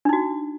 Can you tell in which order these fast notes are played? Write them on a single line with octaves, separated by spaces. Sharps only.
D4 D#4 F#4